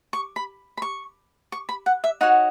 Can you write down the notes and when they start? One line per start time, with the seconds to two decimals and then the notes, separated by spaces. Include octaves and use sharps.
0.13 C#6
0.36 B5
0.77 B5
0.82 C#6
1.52 C#6
1.69 B5
1.86 F#5
2.04 E5
2.21 D#4 F#4 C#5 F#5